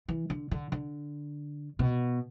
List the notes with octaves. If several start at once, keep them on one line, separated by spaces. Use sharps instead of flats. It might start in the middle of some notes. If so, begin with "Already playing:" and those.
E3
D3
D3
D3
B2